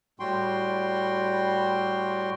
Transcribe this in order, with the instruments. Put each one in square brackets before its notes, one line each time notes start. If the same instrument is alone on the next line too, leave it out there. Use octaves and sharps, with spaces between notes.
[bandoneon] A2 G3 F#4 G5 C6